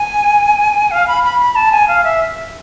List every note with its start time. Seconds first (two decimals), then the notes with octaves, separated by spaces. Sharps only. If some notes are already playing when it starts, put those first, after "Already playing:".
Already playing: G#5
0.91 F5
1.08 B5
1.24 B5
1.40 B5
1.56 A5
1.72 G#5
1.88 F5
2.04 E5